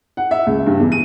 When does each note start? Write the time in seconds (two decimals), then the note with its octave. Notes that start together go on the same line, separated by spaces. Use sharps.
0.17 F#5
0.31 E5
0.46 C#2
0.66 G2
0.79 E2
0.92 D#7